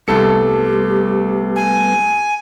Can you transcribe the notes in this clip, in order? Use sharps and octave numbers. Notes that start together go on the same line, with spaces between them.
C2 G3 A3 B3 G4 A4 C#7
G#5